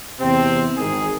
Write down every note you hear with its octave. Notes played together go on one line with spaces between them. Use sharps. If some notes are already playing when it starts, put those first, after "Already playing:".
E2 C3 C4
G#1 D#3 G#4